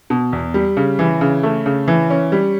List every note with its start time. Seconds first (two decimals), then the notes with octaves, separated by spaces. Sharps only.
0.10 B2
0.33 E2
0.54 G3
0.77 C#3
0.99 E3
1.21 C#3
1.43 A3
1.66 C#3
1.88 E3
2.10 C#4
2.32 G3